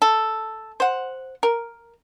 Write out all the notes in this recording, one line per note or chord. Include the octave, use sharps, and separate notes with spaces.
A4
C5 F#5
A#4